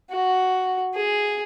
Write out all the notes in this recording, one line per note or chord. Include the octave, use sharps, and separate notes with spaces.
F#4
G#4